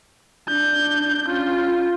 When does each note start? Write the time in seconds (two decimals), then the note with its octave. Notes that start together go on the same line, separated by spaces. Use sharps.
0.48 D4 G6
1.27 C#4 F4